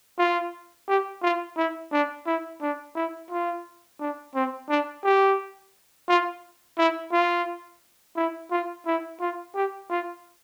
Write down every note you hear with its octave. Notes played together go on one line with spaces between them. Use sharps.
F4
G4
F4
E4
D4
E4
D4
E4
F4
D4
C4
D4
G4
F4
E4
F4
E4
F4
E4
F4
G4
F4